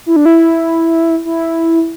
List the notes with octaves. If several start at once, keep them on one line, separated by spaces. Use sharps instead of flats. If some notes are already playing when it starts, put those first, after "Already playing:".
E4
D4
E4
E4